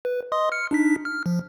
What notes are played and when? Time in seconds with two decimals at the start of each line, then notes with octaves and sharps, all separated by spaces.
0.05 B4
0.32 D#5 C6 D#6
0.52 F6 C#7
0.71 D4 D#4 B6
1.05 F6
1.26 F3